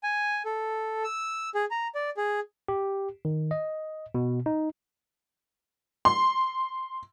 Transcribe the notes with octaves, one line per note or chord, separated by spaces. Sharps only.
G#5
A4
E6
G#4
A#5
D5
G#4
G4
D#3
D#5
B2
D#4
C6